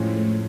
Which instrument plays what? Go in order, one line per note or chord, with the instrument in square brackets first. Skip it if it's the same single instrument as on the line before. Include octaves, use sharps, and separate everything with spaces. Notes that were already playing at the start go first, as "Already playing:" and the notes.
Already playing: [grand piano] F2 F3 G#3 C#4 [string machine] A2